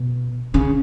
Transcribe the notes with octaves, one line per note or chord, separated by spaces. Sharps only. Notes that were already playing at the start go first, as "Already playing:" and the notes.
Already playing: B2
C#3